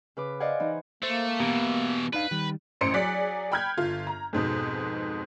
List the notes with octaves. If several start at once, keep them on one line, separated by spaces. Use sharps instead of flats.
C#3 B4 D6
C5 D5 D#5 F5 F#5 G#5
E3 D#4
A3 A#3 C5
B2 E3 B3 G4 A#5
D4 D#4 B4 F5
D#3 G3
A1 F#2 C5 C6 C#7 D7
F#3 G#4 D5 F#6 B6
G5 B5 F6 G6 G#6
G1 F4
A#5
F2 G#2 B2